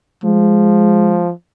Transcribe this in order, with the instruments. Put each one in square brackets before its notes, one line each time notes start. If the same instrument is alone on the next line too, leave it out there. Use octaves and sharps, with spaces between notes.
[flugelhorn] F3 [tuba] G#3